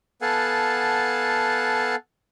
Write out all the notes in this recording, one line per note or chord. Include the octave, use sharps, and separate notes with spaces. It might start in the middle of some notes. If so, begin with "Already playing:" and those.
B3 A4 F5 F#5 G#5 A5